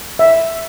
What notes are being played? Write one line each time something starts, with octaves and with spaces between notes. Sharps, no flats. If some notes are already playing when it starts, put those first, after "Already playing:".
E5